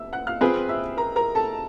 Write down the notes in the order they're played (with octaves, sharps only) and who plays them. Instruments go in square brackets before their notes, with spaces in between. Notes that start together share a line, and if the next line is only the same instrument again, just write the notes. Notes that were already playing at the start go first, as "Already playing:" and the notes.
Already playing: [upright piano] E5 E6
F#5 F#6
F5 F6
[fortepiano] C4 F4 G#4 B4
[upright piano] E5 E6
A#4 A#5
A#4 A#5
A4 A5